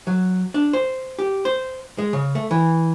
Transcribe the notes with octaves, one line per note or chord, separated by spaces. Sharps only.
F#3
D4
C5
G4
C5
G#3
C#3
A3
E3